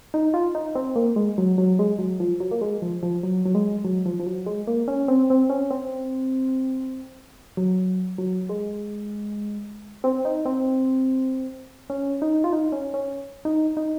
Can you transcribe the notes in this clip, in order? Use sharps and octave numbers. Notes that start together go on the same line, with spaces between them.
D#4
F4
D#4
C4
A#3
G#3
F#3
F#3
G#3
F#3
F3
F#3
A#3
G#3
F3
F3
F#3
F#3
G#3
F#3
F3
F3
F#3
G#3
A#3
C#4
C4
C4
C#4
C4
F#3
F#3
G#3
C4
D#4
C4
C#4
D#4
F4
D#4
C#4
C#4
D#4
D#4